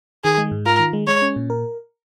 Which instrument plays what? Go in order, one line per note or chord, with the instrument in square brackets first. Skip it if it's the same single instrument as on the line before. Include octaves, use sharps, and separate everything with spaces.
[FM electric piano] D#3 [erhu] G#4
[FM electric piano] G#3
G#2
[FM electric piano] F4 [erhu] A#4
[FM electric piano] D#3
G#3
[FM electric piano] G#3 [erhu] C#5
[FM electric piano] C#4
A#2
A#4